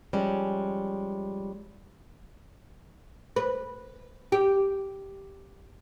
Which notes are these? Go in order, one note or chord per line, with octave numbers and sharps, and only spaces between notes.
F3 G3 G#3 C#4
B4
G4